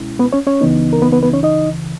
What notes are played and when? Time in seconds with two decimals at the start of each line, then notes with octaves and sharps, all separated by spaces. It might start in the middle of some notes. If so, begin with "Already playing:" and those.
Already playing: C#2 B2 G#3 C#4 E4
0.19 B3 B4
0.33 C#4 C#5
0.47 C#4 C#5
0.61 C#2 C#3 E3 B3 D#4
0.93 A#4
1.02 B3 B4
1.12 B3 B4
1.23 B3 B4
1.33 C#4 C#5
1.43 D#4 D#5